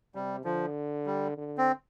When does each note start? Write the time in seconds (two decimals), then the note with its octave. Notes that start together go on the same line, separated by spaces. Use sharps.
0.15 C3 G3
0.44 D3 F3
1.06 G3
1.38 D3
1.58 C4